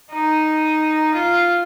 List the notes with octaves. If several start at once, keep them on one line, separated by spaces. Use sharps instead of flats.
D#4
F4